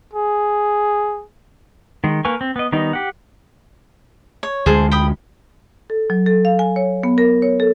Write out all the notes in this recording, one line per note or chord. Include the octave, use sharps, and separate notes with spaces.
G#4
D#3 G#3
A#3 A#4 B4 G#5 C#6
C4
B3 D#5
D#3 G3 B3 D#4
G4 F#5
C#5
D2 G#3 G#4 C5 A5
G5 B5 D#6
A4
F#3
A4
F5
G#5
C#5
B3
A#4
C#5
A4